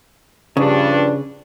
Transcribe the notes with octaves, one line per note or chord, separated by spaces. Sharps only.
G2 C#3 F3 D4